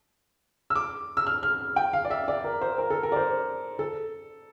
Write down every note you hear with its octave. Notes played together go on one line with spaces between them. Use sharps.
E6
D6
E6
F6
F6
G5
F5
D5
E5
D5
A#4
C5
A#4
A4
A#4
D5
C5
A4